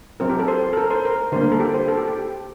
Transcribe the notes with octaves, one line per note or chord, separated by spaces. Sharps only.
F#3 C4 A#4
G4
A4
C5
A4
A#4
C5
A#4
D3 G3 A#3 C5
A#4
A4
G4
C5
A4
G4
G4